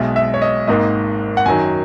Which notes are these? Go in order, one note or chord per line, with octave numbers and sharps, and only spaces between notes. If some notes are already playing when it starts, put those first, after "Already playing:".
Already playing: B1 B2 G#3 E5
E5
C#5
D#5
G#1 G#2 D#3 A#3 D#5
F#5
F#2 D#3 F#3 G#5